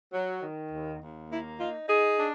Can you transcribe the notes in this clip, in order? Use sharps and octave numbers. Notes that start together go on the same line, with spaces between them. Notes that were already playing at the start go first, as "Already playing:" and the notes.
F#3
D#3
D#2
D#2
A#3 E4
D#4 F4
D#4 G#4
D4